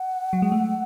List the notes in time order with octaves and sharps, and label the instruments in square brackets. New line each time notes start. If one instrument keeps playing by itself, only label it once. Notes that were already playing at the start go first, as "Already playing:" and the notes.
Already playing: [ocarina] F#5
[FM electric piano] F#3
G#3
A3